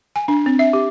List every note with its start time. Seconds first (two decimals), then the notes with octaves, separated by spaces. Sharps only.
0.16 G#5
0.28 D4
0.46 C4
0.59 E5
0.73 G4